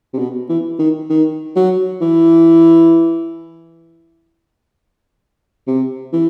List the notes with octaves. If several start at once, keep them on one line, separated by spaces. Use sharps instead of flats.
C3
B2
E3
D#3
D#3
F#3
E3
C3
E3